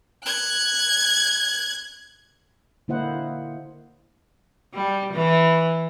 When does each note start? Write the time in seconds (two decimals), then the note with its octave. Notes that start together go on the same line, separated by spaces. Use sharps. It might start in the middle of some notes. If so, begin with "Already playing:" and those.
0.25 F#6 G#6
2.88 D3 A#3 E4 C5 D#5 F#5
4.74 G3
5.13 E3